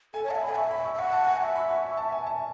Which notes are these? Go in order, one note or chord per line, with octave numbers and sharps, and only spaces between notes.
A4 G#5
C#5 A5
F#5
E5
B5
G#5
E5 C#6
B5
C#6
E5
F#5 C#6
A5
G#5
E5 C#6
B5
C#6
C#6
A5
G#5
A5